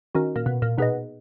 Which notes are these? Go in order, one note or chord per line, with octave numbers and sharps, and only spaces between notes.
D#3 C#4 F#4 A#4
A#2
B2
A#2
B2 D#4 G#4 B4 D#5